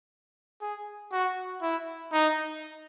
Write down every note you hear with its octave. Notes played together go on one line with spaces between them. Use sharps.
G#4
F#4
E4
D#4